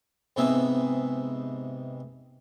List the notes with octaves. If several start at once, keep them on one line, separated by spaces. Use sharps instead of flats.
G#2 C3 B3 D#4 E5 G#5